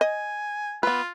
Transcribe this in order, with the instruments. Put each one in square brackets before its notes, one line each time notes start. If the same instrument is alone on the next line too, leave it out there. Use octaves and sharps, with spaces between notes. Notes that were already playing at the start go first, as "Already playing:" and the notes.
[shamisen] D#5 [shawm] G#5
[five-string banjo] B3 B4 [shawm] F4